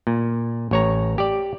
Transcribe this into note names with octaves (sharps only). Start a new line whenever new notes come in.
A#2
A1 C#5 A#5
G4 D5